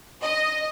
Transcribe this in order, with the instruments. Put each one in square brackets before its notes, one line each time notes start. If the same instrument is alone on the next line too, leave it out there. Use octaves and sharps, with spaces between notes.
[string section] D#5